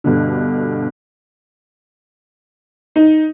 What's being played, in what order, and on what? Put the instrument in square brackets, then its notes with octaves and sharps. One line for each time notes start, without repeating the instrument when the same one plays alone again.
[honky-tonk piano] G2 B2 D3
D#4